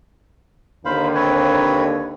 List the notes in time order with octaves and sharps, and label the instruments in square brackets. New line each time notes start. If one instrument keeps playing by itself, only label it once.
[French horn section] D#2 D3 [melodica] C5 F5 B5
[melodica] C4 B4 C#5